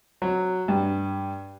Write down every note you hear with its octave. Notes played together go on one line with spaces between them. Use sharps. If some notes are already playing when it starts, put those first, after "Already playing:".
F#3
G2